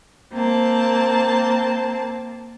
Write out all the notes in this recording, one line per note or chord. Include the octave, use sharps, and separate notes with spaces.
A#3 C4 A5